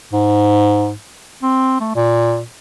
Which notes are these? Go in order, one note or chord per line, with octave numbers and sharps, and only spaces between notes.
G#2
C4
A3
A#2